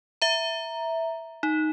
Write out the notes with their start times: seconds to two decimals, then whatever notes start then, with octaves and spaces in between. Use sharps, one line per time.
0.22 E5 A#5
1.43 D#4